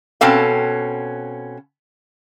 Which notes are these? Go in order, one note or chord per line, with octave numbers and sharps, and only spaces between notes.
B2 C4 C#4 A4 F5